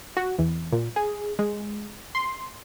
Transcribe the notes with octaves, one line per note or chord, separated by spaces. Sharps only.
F#4
E2
A#2
G#4
G#3
C6